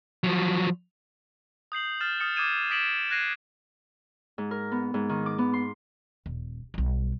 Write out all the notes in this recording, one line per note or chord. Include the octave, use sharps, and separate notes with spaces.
F3 F#3
D#6 G6 C7 F#7
F6 A6 E7
D#6 F6 A6 C#7
D6 D#6 G6 G#6 D#7 E7
D#6 A6 B6 D7 E7 F#7
F#6 G#6 A#6 C7 D#7
G#2
A#4
B3
G#2
D#3
D6
B3
C6
D#1
B1 G3